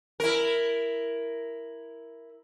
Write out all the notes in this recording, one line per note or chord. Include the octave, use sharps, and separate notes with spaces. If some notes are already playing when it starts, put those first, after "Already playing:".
E4 A#4